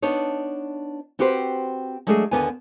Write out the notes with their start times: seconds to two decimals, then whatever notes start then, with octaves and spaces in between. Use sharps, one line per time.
0.02 B3 D4 D#4 C#5
1.19 C4 F#4 G4 B4 C5
2.07 F#3 G#3 A3 D4 G4 G#4
2.31 D#2 D3 B3 B4 G#5